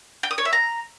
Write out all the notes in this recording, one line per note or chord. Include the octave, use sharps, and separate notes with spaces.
G5
D#6
C#5
E5
A#5